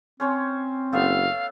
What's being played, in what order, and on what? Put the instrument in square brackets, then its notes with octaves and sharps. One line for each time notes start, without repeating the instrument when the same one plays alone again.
[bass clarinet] C4 [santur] C#4 C5 C#5
[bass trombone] F#1 [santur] A3 B3 E5 [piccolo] F5